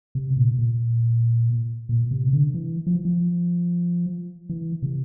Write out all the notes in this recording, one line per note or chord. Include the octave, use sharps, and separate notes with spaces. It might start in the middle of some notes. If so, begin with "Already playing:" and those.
C3
A#2
A#2
A#2
C3
D3
E3
F3
F3
E3
C3